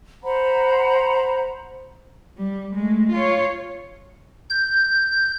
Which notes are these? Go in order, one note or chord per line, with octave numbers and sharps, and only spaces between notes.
C5 F#5 A#5 B5
G3
G#3 A3
F4 C#5
G6